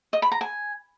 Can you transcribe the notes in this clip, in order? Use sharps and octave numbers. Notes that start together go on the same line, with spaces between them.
D#5
B5
A#5
G#5